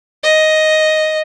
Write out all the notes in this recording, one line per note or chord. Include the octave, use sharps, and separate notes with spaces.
D#5